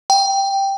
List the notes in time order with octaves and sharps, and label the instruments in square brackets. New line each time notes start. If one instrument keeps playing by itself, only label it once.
[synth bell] G5